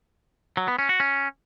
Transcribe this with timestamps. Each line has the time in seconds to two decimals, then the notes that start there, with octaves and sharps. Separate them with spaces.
0.57 F#3
0.68 B3
0.79 C#4
0.89 F#4
1.00 C#4